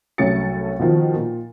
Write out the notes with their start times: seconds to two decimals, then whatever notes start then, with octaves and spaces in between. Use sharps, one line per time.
0.18 C2 F#3 A3 C#4 A6 C#7
0.79 B2 D#3 F3
1.14 A#2